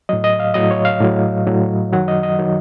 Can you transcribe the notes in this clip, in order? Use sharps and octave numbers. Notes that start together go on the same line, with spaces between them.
A2 F#3 D#5
D#5
F5
A2 F#3 D#5
C#5
F5
A2 F#3
A2 F#3
F#2 D#3 F#3 F#5
D#5
D#5
D#3 F#3